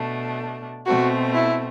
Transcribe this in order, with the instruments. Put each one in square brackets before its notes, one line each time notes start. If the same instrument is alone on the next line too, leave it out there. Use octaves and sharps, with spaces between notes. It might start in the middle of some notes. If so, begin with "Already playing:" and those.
Already playing: [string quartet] B2 A3 D4
[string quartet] B2 A3 C4 [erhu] F#4
[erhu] E4